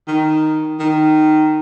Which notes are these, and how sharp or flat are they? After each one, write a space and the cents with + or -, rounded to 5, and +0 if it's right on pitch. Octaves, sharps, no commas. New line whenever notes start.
D#3 +0
D#3 -10